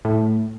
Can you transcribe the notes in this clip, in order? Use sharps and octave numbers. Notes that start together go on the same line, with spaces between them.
A2